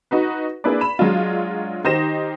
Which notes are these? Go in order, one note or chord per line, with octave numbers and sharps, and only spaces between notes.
D#4 F#4 B4
A#3 D4 E4 G#4 B4 D5
B5 E7
F#3 G#3 D4 F4
D#3 D#4 G4 C5 A#6 E7